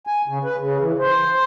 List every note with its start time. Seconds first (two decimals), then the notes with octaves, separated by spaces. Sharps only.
0.07 G#5
0.28 C#3
0.44 B4
0.60 C#3
0.81 E3
0.99 C5